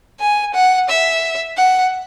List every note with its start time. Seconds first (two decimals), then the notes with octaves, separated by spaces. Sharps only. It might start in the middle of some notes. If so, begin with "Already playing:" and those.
0.20 G#5
0.55 F#5
0.89 E5
1.57 F#5